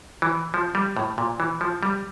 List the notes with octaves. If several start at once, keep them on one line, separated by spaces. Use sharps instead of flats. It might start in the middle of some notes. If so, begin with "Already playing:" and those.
E3
F3
G3
A2
A#2
E3
F3
G3